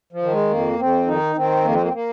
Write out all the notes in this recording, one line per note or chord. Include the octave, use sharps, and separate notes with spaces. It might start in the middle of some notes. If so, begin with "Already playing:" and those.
F3
D#3
G#3
F2 A#3
F2 C4
D#3 D#4
D#3 C4
F2 A#3
C4
A#3
C4
A#3